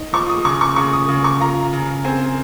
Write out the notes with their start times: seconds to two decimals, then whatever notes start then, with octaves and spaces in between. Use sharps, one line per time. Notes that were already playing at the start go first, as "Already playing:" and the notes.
Already playing: D#4
0.13 F3 C#6
0.29 D#6
0.45 C#3 C#6
0.61 C#6
0.76 C#3 C#6
0.93 D#6
1.09 C#3
1.24 C#6
1.40 F4 A#5
1.73 C#3
2.05 C4 G#5